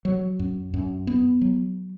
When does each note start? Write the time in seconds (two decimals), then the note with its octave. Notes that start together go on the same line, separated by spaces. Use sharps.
0.05 F#3
0.39 F#2
0.74 F#2
1.07 B3
1.41 F#3